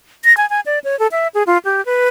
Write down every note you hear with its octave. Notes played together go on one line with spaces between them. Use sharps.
A#6
G#5
G#5
D5
C#5
A4
E5
G#4
F4
G4
B4